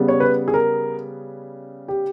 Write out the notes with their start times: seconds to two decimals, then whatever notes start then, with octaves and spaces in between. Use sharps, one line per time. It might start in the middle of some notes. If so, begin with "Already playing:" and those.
Already playing: C#3 G3 B3
0.08 C#5
0.20 B4
0.48 G#4
0.54 A#4
1.88 G4